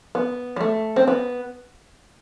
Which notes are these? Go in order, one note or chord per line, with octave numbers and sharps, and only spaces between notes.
B3
G3
A3
C4
B3